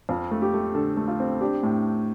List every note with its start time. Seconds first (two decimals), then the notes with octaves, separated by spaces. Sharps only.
0.09 F2 F4
0.31 A3
0.42 G4
0.54 A3
0.75 D3 A4
0.97 A3
1.08 F4
1.20 C4
1.41 D4 G4
1.63 A2